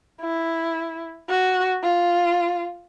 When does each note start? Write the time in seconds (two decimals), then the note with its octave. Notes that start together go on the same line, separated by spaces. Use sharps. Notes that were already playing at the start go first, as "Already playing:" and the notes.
0.21 E4
1.29 F#4
1.83 F4